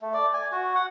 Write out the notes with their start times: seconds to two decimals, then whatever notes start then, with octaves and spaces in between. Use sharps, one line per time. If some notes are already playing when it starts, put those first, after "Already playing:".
0.01 A3
0.14 D5
0.34 G#5
0.52 F#4
0.75 F#5